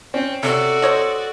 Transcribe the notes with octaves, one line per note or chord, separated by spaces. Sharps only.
C4 C#4
C3 C#4 F#4 A4 D5
C5 C#5 D#5